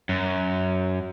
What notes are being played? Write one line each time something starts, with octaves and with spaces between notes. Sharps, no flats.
F#2